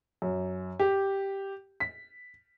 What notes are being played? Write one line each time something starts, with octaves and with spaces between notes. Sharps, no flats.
F#2
G4
B6